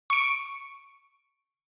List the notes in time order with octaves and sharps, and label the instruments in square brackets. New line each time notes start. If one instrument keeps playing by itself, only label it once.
[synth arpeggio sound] C#6 D7